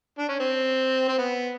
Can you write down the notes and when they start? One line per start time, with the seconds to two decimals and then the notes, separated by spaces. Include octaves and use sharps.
0.19 D4
0.29 C#4
0.40 C4
1.08 C4
1.18 B3